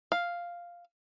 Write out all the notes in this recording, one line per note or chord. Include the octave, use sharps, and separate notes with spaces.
F5